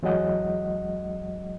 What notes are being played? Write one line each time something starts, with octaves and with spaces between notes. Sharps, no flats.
E2 F#3 G#3 D#5 F#5